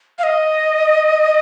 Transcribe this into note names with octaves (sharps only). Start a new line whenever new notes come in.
F5
D#5